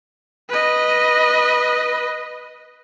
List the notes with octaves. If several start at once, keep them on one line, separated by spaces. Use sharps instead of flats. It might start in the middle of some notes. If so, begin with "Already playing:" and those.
B4 D#5